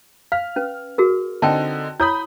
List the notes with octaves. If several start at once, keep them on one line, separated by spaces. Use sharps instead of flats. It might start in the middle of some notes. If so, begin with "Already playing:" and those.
F5 F6
C#4 B4
F#4 G#4 A#4
D3 C4 D#4 G5 A5
E4 C#5 B5 D#6 G6